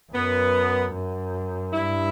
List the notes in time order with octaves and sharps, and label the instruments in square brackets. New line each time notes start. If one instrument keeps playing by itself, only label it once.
[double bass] F#2 [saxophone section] B3
[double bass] F#2
[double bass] G2 [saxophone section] E4